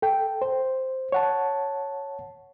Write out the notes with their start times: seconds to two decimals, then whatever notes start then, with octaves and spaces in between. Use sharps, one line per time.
0.02 A4 G5
0.42 C5
1.12 C#5 F#5 A5